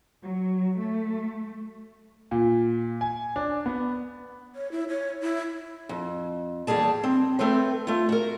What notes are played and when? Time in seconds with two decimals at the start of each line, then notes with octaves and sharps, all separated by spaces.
0.23 F#3
0.78 A3
2.31 A#2
3.01 G#5
3.36 D4
3.66 B3
4.55 C#5
4.72 E4
4.89 C#5
5.21 E4
5.89 F2
6.67 E2 G3 A#3 G#4 A5
7.03 C4
7.39 A3 C4 A4 B4 C5
7.87 A3 F4
8.09 F#4 A#4